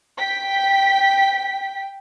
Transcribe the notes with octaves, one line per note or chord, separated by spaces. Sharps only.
G5 B6